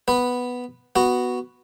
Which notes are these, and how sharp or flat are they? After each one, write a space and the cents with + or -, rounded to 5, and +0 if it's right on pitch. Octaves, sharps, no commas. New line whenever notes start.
B3 +0 B4 +0
B3 +0 F#4 +0